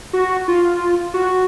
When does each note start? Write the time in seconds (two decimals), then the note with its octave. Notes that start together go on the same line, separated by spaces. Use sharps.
0.13 F#4
0.48 F4
1.14 F#4